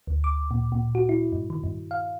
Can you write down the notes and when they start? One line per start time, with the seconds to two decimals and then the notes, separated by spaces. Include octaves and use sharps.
0.07 D2
0.24 D6
0.51 A#2
0.72 A#2
0.95 F#4
1.09 E4
1.32 G2
1.50 D#3
1.63 G2
1.91 F5